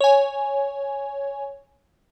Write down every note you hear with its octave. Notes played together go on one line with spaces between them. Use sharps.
C#5 G#5